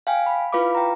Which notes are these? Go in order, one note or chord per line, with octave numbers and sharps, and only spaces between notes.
F5 G5 G#5
B5
E4 F4 B4 F5 B5 D6
G5 A#5